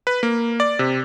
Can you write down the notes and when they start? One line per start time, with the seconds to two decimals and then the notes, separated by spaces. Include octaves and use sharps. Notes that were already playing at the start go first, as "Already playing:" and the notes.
0.07 B4
0.23 A#3
0.60 D5
0.79 C3